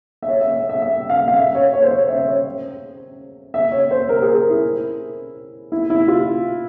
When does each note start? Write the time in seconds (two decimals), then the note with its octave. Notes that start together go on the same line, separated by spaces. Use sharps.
0.23 E5
0.28 C#5
0.41 E5
0.56 E5
0.69 E5
0.82 E5
1.10 F5
1.28 F5
1.36 E5
1.55 C#5
1.73 C#5
1.83 C5
1.91 C#5
2.09 E5
2.20 E5
2.28 C#5
3.54 E5
3.72 C#5
3.91 C5
4.09 A#4
4.22 G#4
4.35 A#4
4.50 E4
5.72 E4
5.90 E4
6.08 F4